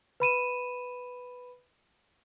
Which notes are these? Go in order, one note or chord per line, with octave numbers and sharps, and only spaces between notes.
B4 B5 D#7 E7